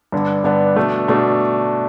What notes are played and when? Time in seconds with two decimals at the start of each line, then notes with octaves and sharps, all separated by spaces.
0.12 G2 D3 B3 D4
0.44 G2 D3 B3 D4
0.76 B2 A3 D4
1.08 B2 A3 D4